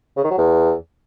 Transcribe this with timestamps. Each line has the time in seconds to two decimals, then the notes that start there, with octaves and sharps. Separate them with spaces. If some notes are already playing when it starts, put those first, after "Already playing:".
0.17 C#3
0.24 D#3
0.31 F#3
0.38 E2